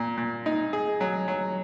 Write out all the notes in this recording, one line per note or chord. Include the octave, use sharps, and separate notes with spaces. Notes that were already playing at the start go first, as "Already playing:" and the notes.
Already playing: A#2
A#2
D#4
G#4
F#3
F#3